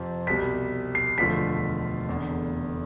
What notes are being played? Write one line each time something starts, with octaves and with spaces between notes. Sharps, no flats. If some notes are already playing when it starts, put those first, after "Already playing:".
Already playing: F2 C3 F3 C4
C2 B2 G3 B6
C7
E1 D2 D3 F3 A3 B6
F1 E2 D3